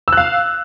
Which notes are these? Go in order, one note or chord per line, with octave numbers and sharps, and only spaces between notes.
F5 E6 F#6